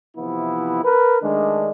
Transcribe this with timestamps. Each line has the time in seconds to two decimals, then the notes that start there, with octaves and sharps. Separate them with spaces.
0.17 C3 E3 F3 B3 E4
0.83 A#4 B4
1.22 D#3 G#3 A3 D4